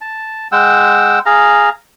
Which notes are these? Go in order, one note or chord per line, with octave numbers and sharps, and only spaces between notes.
A5
G#3 F#5 G5 E6
G#4 F5 A#5